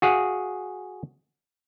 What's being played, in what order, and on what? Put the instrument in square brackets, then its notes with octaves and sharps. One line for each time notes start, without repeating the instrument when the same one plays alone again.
[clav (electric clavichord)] F#4 G#4 F5 F#5